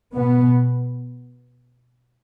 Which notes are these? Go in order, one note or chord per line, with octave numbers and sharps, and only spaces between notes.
B2 B3